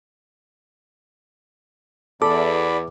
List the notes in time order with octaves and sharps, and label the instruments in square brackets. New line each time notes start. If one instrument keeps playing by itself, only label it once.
[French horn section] E2 [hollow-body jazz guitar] A4 [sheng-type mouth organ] D5 B5 [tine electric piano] D6